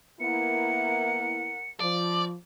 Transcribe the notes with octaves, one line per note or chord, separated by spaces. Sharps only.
A#3 B3 E4 A#4 F#5 C#7
F3 D5